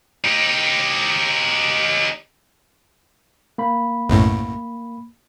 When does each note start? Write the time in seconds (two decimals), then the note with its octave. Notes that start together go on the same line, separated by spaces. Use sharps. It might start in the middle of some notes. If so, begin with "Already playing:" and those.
0.24 D#4 G4
3.58 A#3 B5
4.10 B1 F#2 A2